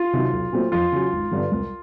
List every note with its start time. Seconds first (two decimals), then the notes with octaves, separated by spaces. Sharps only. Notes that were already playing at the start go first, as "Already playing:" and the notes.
Already playing: F4
0.13 C3 D#3 F#3
0.33 B1
0.53 A#2 F#3 A3 C4
0.72 F2 F4
0.92 C#3 F#3
1.13 G#1
1.31 G2 D3 G3 B3
1.52 C2